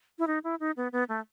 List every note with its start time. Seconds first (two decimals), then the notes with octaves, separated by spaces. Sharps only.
0.19 E4
0.27 D#4
0.44 E4
0.60 D#4
0.77 B3
0.92 B3
1.09 A3